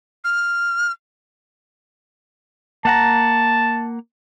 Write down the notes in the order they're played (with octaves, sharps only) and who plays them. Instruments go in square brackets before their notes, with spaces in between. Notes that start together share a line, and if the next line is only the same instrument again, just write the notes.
[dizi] F6
[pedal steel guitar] A#3 F#5 A#5 [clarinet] A5